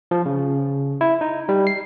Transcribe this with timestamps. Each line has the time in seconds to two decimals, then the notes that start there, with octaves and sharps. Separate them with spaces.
0.11 F3
0.26 C#3
1.01 E4
1.21 D#4
1.49 G3
1.67 C7